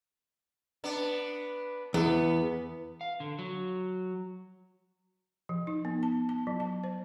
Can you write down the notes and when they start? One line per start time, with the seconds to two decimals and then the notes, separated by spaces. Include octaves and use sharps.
0.84 B3 D4
1.94 E2 B3
3.01 F5
3.20 D3
3.39 F#3
5.49 F3
5.67 D#4
5.85 B3
6.03 A5
6.29 A5
6.47 F#3
6.60 A5
6.84 C5